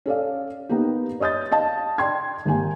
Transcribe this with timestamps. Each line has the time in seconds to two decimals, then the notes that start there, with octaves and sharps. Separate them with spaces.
0.06 C#4 A4 D5 F5
0.69 A#3 B3 D#4 G4
1.20 C#5 D#5 D#6 G6 A6
1.51 D#5 F5 A5
1.98 D5 G5 C6 G#6
2.45 G#1 A#3 G4 G#5